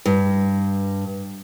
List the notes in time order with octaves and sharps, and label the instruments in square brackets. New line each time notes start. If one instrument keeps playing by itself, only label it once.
[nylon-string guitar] G2